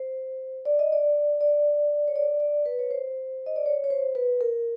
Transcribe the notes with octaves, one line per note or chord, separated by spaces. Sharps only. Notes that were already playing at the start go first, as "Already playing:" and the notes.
Already playing: C5
D5
D#5
D5
D5
C#5
D5
D5
B4
C#5
C5
D#5
D5
C#5
C#5
C5
B4
A#4